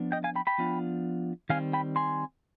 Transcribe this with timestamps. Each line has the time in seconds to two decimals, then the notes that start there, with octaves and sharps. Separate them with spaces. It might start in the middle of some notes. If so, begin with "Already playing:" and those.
Already playing: F3 B3 D4
0.12 D#5 G5
0.24 F5 G#5
0.36 G5 B5
0.47 G5 B5
0.58 F3 B3 D4 F4
1.49 D#3 G3 C4 F5 G#5
1.73 G5 B5
1.96 G#5 C6